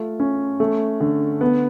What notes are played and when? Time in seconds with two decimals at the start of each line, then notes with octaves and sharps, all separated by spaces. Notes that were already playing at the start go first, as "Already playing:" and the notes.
Already playing: A3 F4
0.20 C#4
0.60 A3
1.00 D3
1.41 B3